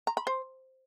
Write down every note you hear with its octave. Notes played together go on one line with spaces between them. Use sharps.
A#5
B5
C5